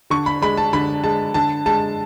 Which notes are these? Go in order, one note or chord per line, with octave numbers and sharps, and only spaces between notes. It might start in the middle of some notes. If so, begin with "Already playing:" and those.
D3 C#6
B5
G#3 B5
A5
D3 B5
G#3 A5
D3 A5
G#3 A5